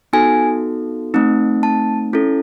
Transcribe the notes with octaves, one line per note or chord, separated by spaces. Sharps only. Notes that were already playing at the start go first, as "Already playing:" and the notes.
B3 D#4 F#4 A4 G#5
A3 C4 D#4
A5
C#4 E4 A4